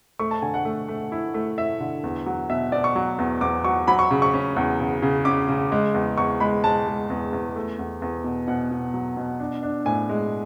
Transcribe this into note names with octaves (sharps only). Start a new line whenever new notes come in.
A3 C#6
A5
D3 G#5
F#5
A3
A3
E4
A3
E4 E5
D3
E2
F#3
B2 E5
B2 D5
C#6
F#3
E2
E2 D6
F#3 C#6
F#3 B5
C#6
C#3
C#6
C#4
E2
C#3
C#3
C#4 D6
C#3
G#3
E2
E2 C#6
G#3 B5
G#3 A5
G#3
E2
E2
A3
E2
E2
B2
B2 F#5
B2
F#3
B2
D4
D4
A2 G#5
G#3